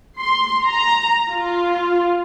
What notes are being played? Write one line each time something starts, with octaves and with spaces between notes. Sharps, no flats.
C6
A#5
F4